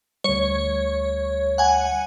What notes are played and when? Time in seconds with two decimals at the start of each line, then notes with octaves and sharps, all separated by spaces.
0.24 D2 G3 C#5
1.58 F#5 G#5